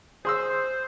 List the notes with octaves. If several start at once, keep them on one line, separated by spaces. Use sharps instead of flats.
G#4 C5 C6 E6